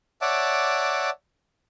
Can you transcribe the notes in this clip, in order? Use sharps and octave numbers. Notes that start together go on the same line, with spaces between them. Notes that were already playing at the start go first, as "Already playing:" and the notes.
C#5 D5 E5 F#5 A5 D6